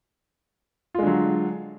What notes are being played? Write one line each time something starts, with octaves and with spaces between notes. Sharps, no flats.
D3 F#3 G#3 F4